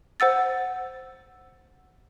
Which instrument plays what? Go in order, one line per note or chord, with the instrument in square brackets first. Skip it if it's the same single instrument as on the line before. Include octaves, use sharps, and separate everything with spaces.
[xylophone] C5 F#5 E6 A6